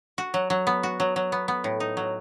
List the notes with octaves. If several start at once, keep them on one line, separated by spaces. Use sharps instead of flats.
F#4
F#3
F#3
B3
F#4
F#3
F#3
B3
B3
A2
D#4
F#3